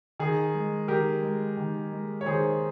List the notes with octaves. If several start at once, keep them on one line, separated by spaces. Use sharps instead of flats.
D#3 G#4
G#3
D#3 G4 A#4
G#3
D#3
G#3
C#5
D#3 G#4 C5